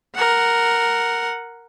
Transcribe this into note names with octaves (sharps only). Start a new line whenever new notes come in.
A#4 F#5